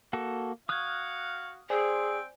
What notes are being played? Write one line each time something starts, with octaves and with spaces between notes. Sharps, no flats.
A#3 F#4 A4
F#4 F5 C#6 D#6 F6 F#6 G#6
C4 G#4 C5 D5 G5 G#5